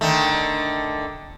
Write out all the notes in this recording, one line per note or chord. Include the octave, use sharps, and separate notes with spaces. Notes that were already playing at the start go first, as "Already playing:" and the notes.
D3 D#3 A3